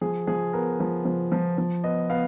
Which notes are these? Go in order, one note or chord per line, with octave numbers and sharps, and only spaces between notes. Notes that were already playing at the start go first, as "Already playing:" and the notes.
F3 G#4
F3 G#4
B3 A#4
F3
F3
F3
F3
B3 D#5
B3 F5